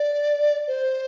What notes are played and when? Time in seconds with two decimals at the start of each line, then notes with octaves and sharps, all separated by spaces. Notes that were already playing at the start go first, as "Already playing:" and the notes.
Already playing: D5
0.68 C5